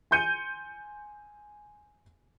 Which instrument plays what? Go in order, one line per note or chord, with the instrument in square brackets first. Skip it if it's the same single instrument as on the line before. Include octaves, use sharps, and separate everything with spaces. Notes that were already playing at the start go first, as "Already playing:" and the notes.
[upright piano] G#5 C6 G6 C#7 D#7